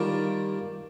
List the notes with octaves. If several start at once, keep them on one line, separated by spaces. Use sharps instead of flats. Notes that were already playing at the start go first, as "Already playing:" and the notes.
Already playing: D#3 G3 A#3 D4 F4